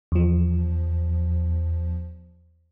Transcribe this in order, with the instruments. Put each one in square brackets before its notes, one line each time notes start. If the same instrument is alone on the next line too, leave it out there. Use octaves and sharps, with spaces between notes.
[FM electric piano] E2 F3